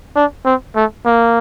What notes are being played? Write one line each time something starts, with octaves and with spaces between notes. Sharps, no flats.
D4
C4
A3
A#3